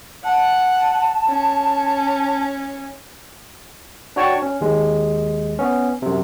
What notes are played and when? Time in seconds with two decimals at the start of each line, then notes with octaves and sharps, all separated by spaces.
0.25 F#5 A5
1.28 C#4
4.16 D4 F#4 C#5 G5 A5 C#6
4.42 C#4
4.61 D#2 G#3
5.59 B3 C#4
6.02 F#2 C3